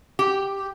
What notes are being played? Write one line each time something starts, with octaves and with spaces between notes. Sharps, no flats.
G4